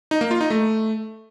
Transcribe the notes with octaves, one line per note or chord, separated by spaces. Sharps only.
D#4
A#3
F4
D#4
A3